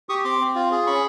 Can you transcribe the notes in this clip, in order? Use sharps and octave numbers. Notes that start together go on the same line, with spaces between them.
G4 C#6 D#6
C4 C6 D6
C4
F4
G#4
C#4 B5 C#6